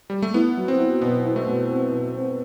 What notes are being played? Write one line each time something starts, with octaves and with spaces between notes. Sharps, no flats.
G3
A3
B3 E4
F#3
C4
E4
B2 B3
E4
A3
B2
C4
B2
C4